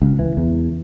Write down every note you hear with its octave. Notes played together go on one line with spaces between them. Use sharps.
C#2
E3
E2